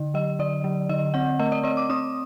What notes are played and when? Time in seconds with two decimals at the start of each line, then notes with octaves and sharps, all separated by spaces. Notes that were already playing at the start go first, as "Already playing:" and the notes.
Already playing: D3
0.14 F#3 D#5
0.39 D3 D5
0.64 F#3
0.89 D3 D#5
1.14 C4 F#5
1.39 A3 D#5
1.52 D5
1.64 C4 D#5
1.77 D6
1.90 C4 D#6